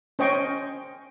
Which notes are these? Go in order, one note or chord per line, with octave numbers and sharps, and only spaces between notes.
C#4 C5 D#5 G5 C#6